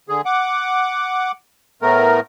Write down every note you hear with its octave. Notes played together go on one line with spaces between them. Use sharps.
D3 G#4
F#5 D6
A2 A3 B3 A#4